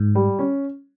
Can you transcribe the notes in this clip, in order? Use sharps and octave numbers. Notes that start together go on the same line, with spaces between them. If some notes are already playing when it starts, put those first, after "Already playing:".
Already playing: G#2
G3
C#4